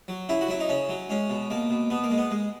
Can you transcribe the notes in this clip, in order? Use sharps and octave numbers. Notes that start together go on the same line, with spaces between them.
F#3
C#3 E4
F#4
F#3 E4
D#4
C#3 C#4
F#3
G#3 C#4
B2
B2 A#3
B2
B2 B3
A#3
G#3
B3
G#3